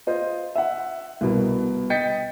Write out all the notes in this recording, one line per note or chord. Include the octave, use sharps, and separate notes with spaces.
F4 C5 D#5
E5 F#5
C2 B2 A#4
D#5 G5 G6 A6 B6 C#7